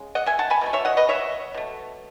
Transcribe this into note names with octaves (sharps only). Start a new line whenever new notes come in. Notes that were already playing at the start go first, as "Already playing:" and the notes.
Already playing: C#3 G#3
D#5 F#5
E5 G#5
F#5 A5
G#5 B5
B2 F#3 A3
C#5 E5
D#5 F#5
B4 D#5
C#5 E5
B2 A3